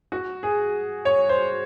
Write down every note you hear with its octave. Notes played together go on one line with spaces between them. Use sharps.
F#4
G#4
C#5
C5